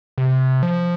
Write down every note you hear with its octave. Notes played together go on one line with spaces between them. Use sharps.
C3
F3